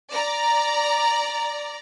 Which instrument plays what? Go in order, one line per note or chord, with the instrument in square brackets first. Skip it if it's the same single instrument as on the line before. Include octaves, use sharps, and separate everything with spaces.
[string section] D5 A#5